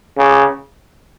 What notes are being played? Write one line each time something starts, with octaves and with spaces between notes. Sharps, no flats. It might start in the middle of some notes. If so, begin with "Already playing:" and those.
C#3